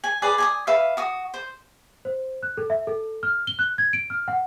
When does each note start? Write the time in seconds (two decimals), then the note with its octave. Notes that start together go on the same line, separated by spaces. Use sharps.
0.04 G#5
0.22 G#4 B4 D5
0.38 G#5 A5 D#6
0.67 B4 E5 F5
0.97 F#4 D#6
1.34 C5
2.05 C5
2.43 F#6
2.57 A4
2.70 E5
2.87 A4
3.23 F6
3.47 G7
3.59 F#6
3.78 G#6
3.93 D7
4.10 F6
4.28 F#5